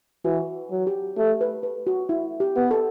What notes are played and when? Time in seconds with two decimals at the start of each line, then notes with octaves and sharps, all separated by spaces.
0.24 E3 F#4
0.71 F#3
0.87 G4
1.17 A3 G4
1.41 B4
1.63 B4
1.87 F#4
2.09 E4
2.40 G4
2.56 B3
2.71 A4